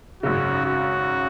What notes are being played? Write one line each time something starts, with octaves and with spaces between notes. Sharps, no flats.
G#1 F#2 C#3 F#4
F#4